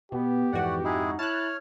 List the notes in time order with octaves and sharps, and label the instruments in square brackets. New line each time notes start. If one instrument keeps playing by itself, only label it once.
[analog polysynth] B2 [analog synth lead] B3 [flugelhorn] G4
[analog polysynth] F2 G#2 F#4 [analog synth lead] E3 [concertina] D5 F#5
[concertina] G#3 E4 G#4 [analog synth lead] D#4
[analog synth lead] E4 [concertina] C#5 F6 [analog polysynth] A5 F#6